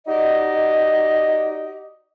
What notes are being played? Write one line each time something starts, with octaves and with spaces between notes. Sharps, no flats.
D#4 F#4 G4 D5 D#5